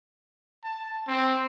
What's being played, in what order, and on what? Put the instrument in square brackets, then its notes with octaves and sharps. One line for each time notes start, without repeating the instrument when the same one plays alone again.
[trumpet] A5
C4